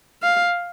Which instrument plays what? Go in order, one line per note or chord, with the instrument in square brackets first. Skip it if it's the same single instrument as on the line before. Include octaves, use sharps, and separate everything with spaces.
[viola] F5